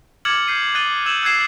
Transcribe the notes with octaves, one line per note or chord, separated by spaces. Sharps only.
D6 F6 G#6 A6 C#7 F#7
G6 C7 D#7
D#6 F#6 A6 D#7 G7
E6 F6 G6 G#6 E7 F#7
E6 F#6 G#6 C7 E7